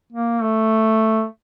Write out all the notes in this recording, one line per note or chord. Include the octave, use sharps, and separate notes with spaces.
A#3
A3